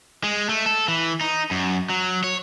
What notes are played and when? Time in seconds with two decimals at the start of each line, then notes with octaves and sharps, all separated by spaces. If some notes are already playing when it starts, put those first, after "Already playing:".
0.24 G#3
0.49 A3
0.66 A4
0.88 E3
1.21 D#4
1.51 F#2
1.90 F#3
2.24 C#5